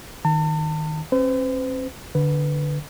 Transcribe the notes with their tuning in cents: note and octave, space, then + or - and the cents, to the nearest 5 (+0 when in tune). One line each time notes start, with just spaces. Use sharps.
D#3 +0 A5 +40
C4 +45 C5 -45
D3 +0 B4 +0